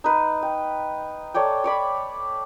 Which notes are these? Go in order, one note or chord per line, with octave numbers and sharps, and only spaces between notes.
D#4 B4
G5
A4 C#5 D5 G5
C#5 D5 B5